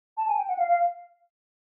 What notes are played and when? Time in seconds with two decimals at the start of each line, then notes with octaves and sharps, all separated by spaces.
0.17 A5
0.28 G#5
0.37 G5
0.48 F#5
0.58 F5
0.69 F5